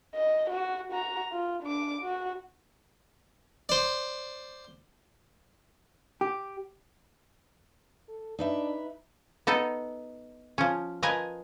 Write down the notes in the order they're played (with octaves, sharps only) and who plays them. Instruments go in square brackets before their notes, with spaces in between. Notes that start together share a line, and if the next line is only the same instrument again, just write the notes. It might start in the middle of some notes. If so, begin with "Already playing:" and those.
[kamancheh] D#5
F#4
F#4 A#5
F4
D4 D6
F#4
[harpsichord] C5 D5
[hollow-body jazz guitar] G4
[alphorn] A4
[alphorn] D4 [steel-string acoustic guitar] D#4 B4 E5
[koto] B3 D#4 A4
F3 C#4
F3 A#4 B4 D#5 G#5